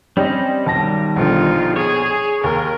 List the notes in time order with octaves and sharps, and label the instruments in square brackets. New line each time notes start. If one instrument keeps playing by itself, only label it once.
[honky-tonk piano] G3 C#5 D#5 [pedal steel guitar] C4 C#4
[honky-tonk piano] B1 A5 A#6 [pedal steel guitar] D#3 G3
[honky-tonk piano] A#1 B2 D3 [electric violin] D#4 F4
[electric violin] G#4 [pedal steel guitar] C#5
[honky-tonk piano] D#2 [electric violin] A#4